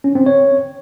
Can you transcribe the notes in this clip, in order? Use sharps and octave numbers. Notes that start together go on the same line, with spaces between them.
C#4
C4
C#5